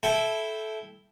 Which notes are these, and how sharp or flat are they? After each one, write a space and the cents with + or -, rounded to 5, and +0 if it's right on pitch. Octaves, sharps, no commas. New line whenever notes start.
E4 +0 A4 -20 G5 +0